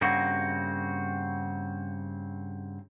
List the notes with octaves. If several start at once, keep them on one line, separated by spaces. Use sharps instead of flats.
G2 C#3 A#3 C4 F#4